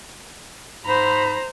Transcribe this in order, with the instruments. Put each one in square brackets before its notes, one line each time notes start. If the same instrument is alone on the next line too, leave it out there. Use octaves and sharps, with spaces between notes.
[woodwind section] G#2 B5 [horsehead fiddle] C5 A#5